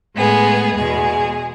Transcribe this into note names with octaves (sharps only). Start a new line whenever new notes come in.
A2 G#3 B3 G#4
E2 B2 G#3 G#4